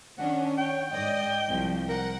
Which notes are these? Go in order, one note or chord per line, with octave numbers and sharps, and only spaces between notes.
D#3 C#4 D4 F#5
C#5 G5
G#2 D5 D#5
C2 F3
A#4 F#5